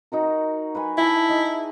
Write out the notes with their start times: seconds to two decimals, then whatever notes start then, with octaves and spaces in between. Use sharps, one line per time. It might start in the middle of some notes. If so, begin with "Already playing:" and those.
0.12 D#4 F#4 A#4
0.75 B4 F#5 G#5
0.98 E4 G#5 A5
1.29 D#4 G#4